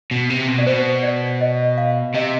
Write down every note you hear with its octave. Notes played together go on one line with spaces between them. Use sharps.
B2
C3
B2
D5
B2 C5
D5
D#5
F5
C3 D#5